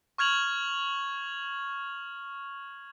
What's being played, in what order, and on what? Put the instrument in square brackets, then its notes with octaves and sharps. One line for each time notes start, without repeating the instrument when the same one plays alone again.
[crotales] C#6 F6 G#6 F7 F#7